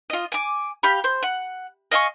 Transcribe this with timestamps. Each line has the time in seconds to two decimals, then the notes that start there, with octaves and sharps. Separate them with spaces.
0.10 F4 D#5
0.32 G#5 D6
0.83 G4 F5 B5
1.04 C5
1.23 F#5
1.91 D#5 F5 G#5 C#6